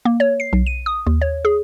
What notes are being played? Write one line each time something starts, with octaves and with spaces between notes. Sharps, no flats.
A#3
C#5
C7
B1
D#7
D#6
D#2
C#5
G#4